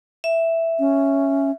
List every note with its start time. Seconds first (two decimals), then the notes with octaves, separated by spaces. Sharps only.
0.24 E5
0.79 C#4